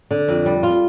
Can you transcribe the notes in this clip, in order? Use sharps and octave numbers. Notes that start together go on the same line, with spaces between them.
D3
F2
G3
F4